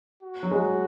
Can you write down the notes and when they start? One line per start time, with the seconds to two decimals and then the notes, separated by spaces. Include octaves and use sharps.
0.23 F#4
0.43 F#3
0.51 G#3